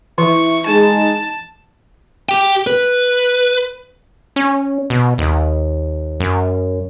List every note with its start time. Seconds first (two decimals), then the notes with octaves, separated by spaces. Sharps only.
0.18 E3 E4 C#6
0.66 G#3 D#4 A5
2.29 G4 G5
2.67 B4
4.36 C#4
4.90 B2
5.18 D#2
6.20 F#2